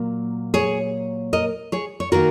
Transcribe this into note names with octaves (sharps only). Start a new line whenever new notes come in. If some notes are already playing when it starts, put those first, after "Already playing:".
Already playing: A#2 F#3 A#3
G#4 C#5
A#4 D#5
G#4 C#5
C#5
D#3 A#3 F#4 A#4